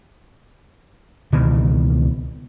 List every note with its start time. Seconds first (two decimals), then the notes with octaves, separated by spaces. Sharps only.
1.32 C#2 B2 D#3 E3